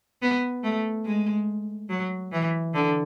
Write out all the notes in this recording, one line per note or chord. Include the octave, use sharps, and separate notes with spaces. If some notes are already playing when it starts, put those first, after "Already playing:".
B3
A3
G#3
F#3
E3
D3